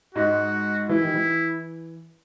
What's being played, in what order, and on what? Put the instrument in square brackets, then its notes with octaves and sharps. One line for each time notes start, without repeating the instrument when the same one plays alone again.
[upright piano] G#2 G#3 [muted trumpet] F#4
[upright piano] E3 [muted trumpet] E4
[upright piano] D#3
E3